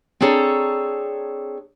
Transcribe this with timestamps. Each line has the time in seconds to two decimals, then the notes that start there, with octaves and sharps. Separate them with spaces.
0.21 C4 D4 G#4 A4 C#5 A#5